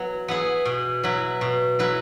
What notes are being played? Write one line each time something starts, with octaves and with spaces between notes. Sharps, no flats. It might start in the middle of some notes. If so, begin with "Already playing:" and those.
Already playing: F#3 B3 E4
B3 E4 G#4
B2
F#3 E4 B4
B2
F#3 E4 B4